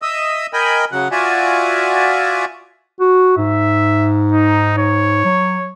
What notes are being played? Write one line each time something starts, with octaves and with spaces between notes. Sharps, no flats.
D#5 E5 D#6 E6
A#4 D#5 G5 G#5 B5
C#3 F#3 F#5
F4 F#4 D5 E5 G#5
F#4
G#2 E5
D#4
C#5
F#3